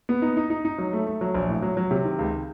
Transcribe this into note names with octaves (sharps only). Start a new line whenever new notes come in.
B3
D#4
D#4
D#4
D#4
F#3
A3
A3
F#3
A#1
A2
F#3
F#3
C3
D#3
C#2